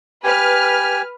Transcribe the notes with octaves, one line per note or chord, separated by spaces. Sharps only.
G4 B4 G#5 F6